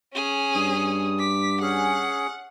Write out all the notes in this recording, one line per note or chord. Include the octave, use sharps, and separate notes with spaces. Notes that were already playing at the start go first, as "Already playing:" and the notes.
C#4 G#4
G2 D#6
D6 B6
C#4 G#4 F#5